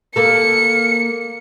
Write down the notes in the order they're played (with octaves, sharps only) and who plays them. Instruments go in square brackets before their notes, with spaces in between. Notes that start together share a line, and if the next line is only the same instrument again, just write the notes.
[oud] A#3 A4 [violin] C#7